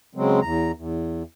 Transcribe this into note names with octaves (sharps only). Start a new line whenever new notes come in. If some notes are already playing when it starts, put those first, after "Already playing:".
C#3 F#3 G#3 C4
E2 A#5
E2